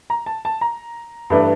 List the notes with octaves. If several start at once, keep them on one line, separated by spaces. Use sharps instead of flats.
A#5
A5
A5
A#5
G2 E3 A3 D4